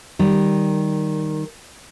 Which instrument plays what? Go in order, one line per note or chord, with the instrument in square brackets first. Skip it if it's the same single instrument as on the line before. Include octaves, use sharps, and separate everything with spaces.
[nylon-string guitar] D#3 G3